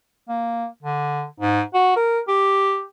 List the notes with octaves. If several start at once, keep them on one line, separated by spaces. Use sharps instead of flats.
A#3
D3
G#2
F#4
A#4
G4